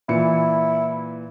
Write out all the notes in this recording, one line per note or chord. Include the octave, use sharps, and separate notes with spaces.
A#2 E3 E4 C#7